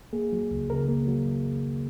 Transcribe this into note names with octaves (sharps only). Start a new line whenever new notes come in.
A#3 G#4
F#3
C#2
C#3 A#4
A#3
F#3